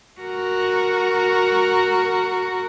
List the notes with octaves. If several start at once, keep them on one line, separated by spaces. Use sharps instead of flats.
F#4 A#4